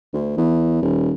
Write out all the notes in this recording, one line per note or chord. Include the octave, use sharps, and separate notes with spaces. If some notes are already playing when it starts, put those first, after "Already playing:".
D2
E2
D#1